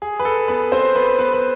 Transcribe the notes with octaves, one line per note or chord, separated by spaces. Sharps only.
G#4
B4
A4
B3 B4
C4 C5
B3 B4
B3 B4
B4